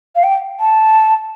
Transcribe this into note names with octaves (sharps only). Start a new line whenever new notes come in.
F5
G5
A5